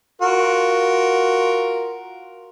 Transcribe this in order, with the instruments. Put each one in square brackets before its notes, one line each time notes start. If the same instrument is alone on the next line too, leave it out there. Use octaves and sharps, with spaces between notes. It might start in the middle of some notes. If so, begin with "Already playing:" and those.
[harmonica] F4 F#4 A#4